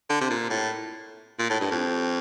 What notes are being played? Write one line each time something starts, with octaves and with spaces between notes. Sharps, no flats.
D3
C3
A#2
A2
A#2
A2
G2
F2